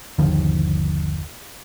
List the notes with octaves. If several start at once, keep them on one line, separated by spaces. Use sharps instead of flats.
G1 D#2 D#3 F3